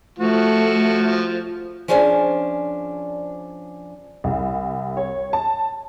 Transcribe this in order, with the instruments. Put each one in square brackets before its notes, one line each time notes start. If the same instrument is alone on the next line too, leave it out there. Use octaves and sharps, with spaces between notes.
[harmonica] F3 F#4 [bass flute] A3
[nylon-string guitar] F3 C#4 D4 G#4 C5 G#5
[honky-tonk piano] C2
C#5
A5